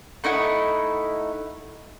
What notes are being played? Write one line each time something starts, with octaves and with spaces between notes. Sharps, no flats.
A3 D#4 E4 F#5